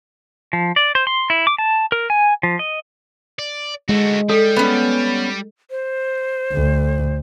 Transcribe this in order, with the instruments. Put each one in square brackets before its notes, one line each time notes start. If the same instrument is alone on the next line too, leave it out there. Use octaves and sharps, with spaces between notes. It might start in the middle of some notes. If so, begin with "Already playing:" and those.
[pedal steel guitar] F3
D5
C5
C6
E4
D6
A5
A#4
G#5
F3
D#5
[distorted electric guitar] D5
[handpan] G#3 [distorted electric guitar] A3 F#4
[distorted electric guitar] G3 [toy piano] A4
[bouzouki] B3 C#4
[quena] C5
[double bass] D2